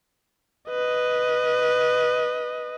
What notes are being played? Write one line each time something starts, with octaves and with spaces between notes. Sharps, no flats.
B4 D#5